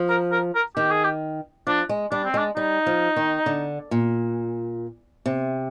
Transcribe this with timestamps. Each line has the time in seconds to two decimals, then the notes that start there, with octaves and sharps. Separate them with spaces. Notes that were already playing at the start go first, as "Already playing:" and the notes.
Already playing: F3
0.09 A#4
0.32 A#4
0.55 A#4
0.77 D#3 G4
0.90 G#4
1.04 G4
1.67 F3 D4
1.89 G#3
2.11 G3 D4
2.24 C4
2.34 G#3 D4
2.56 G3 D#4
2.86 F3
3.16 D#3
3.46 D3
3.91 A#2
5.26 C3